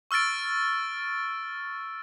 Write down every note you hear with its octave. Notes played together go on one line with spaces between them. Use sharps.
C#6 E6 F6 A6 D7